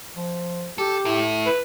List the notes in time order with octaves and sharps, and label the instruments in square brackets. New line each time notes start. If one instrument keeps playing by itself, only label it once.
[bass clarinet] F3
[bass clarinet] G4 [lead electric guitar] A4
[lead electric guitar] E4 A4
[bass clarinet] B4